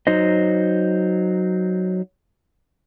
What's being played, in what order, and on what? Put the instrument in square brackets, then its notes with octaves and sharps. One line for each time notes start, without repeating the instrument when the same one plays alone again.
[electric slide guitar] F#3 D#4 C5 D#5